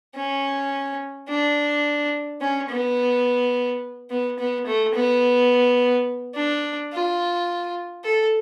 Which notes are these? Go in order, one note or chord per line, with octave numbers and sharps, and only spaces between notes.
C#4
D4
C#4
B3
B3
B3
A3
B3
D4
F4
A4